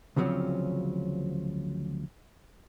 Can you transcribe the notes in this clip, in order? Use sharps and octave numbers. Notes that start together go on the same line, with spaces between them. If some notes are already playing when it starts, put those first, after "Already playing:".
D2 C#3 F3 F#3 C4 C#4